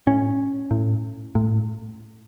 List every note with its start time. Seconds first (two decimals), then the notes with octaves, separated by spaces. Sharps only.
0.07 A2 C#4
0.71 A2
1.35 A2